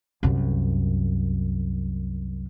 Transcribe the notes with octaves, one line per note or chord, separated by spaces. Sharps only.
C2 F#2